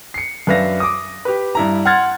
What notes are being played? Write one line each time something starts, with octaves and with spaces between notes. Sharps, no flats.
C7 C#7
F#2 D4 B4 E5 F5 A#6
D6 D#6
G4 B4
G2 E4 A#5
F#5 C6 F6 G#6 A6